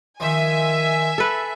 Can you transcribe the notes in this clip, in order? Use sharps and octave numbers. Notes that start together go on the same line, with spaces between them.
D#3 F3 E5 G#5
A4 B4